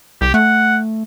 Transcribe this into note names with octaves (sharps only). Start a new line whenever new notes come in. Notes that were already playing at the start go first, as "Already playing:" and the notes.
C2 G4
A3 F#5